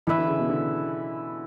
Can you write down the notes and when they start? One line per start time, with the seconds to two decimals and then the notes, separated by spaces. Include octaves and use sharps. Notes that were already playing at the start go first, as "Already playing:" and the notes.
0.07 E3 E4 B4 E5
0.18 D3
0.27 C#3
0.38 B2
0.49 D3